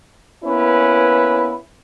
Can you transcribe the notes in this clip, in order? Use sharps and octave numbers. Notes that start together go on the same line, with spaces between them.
A#3 B3 C#4 E4 B4